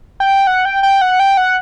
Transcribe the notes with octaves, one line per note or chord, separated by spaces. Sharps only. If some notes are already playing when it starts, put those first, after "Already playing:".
G5
F#5
G5
G5
F#5
G5
F#5